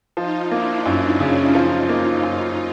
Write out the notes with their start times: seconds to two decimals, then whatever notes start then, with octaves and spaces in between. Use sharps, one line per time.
0.17 F3 D#4 F4
0.51 A#3 D4 E4
0.86 F#2
1.20 C#3 C#4 D#4
1.54 F3 D#4 F4
1.89 A#3 D#4 F4
2.23 F#2 D#4 F4